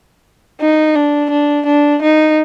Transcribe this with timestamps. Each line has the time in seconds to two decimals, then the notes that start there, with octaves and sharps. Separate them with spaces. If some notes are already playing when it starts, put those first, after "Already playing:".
0.61 D#4
0.96 D4
1.30 D4
1.66 D4
2.02 D#4